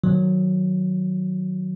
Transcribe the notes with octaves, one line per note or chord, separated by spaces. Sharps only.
D#3 F#3